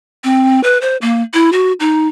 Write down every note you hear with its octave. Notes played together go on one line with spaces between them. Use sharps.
C4
B4
C5
A#3
E4
F#4
D#4